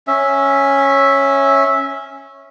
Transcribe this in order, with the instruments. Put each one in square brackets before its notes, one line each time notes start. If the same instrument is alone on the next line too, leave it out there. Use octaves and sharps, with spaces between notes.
[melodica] C#4 E5